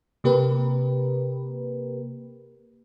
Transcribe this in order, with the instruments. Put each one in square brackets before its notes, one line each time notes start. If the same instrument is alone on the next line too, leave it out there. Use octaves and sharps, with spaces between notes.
[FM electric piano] C3 A#3 G4 A#4 B4